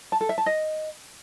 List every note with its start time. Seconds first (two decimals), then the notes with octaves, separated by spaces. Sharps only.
0.12 A5
0.21 A4
0.29 E5
0.38 A5
0.46 D#5